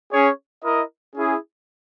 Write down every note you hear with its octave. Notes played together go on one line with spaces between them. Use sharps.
C#4 G#4 C#5
E4 A#4 D#5
C#4 E4 G#4